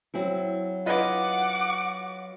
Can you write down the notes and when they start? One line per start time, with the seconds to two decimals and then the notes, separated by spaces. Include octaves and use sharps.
0.14 F#3 C4 E4
0.86 F4 B4 D#5 F#5 D6